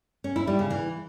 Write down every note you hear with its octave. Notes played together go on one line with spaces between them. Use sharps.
C#4
E4
G3
C#3
E3